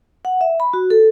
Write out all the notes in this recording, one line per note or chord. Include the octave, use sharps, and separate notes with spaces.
F#5
E5
B5
F#4
A4